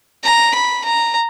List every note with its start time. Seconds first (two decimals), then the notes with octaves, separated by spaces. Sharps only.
0.24 A#5
0.54 B5
0.84 A#5